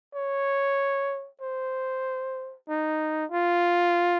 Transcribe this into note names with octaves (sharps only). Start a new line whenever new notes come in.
C#5
C5
D#4
F4